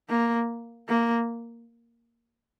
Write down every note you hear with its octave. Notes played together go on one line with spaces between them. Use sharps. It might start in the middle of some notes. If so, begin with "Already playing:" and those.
A#3
A#3